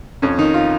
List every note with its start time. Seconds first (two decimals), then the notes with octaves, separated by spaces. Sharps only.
0.22 F2 C#4
0.38 D#3 D#4
0.54 F4